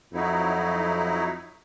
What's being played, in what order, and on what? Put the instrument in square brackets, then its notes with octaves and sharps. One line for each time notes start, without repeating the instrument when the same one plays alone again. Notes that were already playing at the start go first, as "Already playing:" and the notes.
[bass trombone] F2 [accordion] F#3 D#4 E4